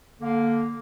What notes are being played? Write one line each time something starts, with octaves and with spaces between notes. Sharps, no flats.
D3 A#3